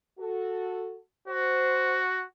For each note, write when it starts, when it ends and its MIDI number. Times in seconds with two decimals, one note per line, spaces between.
0.19 0.96 66
0.19 0.96 69
1.28 2.25 66
1.28 1.98 72